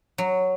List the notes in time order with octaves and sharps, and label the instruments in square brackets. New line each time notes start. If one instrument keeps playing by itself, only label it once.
[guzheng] F#3